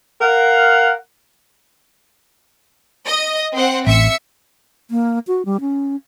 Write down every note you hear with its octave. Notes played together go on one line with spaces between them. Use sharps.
A#4 F5 F#5
D#5
C4 C5 F#5
A1 E5 E6 C#7
A#3
F#4
G3
C#4